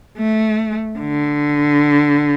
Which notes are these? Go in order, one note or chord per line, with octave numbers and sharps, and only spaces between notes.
A3
D3